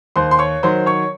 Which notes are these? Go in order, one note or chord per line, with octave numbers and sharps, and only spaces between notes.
D#2 C5 C6
C6
C#5 C#6
D#3 F#3 C5 C6
C#5 C#6